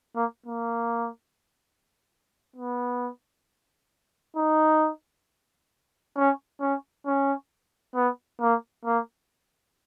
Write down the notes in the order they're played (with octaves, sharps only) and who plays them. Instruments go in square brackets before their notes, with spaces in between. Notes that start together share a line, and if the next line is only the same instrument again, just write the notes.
[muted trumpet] A#3
A#3
B3
D#4
C#4
C#4
C#4
B3
A#3
A#3